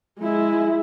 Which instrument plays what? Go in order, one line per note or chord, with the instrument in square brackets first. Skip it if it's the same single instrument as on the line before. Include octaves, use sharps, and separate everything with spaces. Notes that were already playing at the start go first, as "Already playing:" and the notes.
[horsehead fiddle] G#3 E4